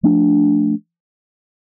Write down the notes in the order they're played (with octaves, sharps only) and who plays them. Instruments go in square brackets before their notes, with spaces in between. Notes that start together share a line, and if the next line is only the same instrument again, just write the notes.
[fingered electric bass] F3 A3 D4